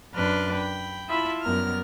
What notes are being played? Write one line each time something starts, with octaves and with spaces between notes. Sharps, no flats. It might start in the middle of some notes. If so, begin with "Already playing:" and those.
F#2 D4 B4 C6 F6
G5 B5
E4 F4 E5 A5 B5
F#2 G3 B3 A#4 F6